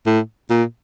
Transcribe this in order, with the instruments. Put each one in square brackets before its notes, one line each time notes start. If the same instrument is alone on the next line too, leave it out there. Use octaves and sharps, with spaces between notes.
[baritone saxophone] A2
A#2